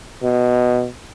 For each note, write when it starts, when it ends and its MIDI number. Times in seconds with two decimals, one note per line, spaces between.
0.23 0.88 47